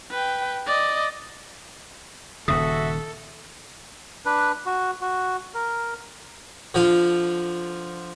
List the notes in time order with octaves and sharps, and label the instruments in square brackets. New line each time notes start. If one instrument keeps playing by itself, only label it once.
[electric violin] B4 G5
D5 D#5
[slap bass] D#1 D#2 C#3 [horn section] F#4 E5 [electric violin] A4 [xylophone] D#6
[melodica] D4 B4
F#4
F#4
A#4
[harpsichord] D3 F3 F4